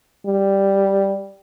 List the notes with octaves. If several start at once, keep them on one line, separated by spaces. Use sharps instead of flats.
G3